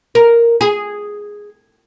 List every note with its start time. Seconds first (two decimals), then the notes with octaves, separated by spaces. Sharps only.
0.15 A#4
0.61 G#4